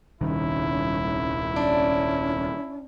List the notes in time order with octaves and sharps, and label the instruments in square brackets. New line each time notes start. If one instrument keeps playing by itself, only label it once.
[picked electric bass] D#1 C2 D#3 [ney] C#4 [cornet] E4
[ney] C#4 [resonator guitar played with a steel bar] D4